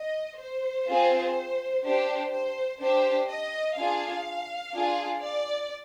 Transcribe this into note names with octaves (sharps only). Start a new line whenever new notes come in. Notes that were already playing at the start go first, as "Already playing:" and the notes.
Already playing: D#5
C5
C4 F4 G#4
D4 G4 C5
C5
D4 G4 C5
D#5
D4 F4 G#4 F5
D4 F4 G#4
D5